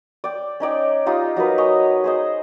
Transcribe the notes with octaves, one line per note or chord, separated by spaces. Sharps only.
D5 G5
C#4 D#4 D5 G5
D#4 F4 G4
F#3 D#4 A#4 B4
C#5 D#5 G#5 C#6
G#4 C5 D#5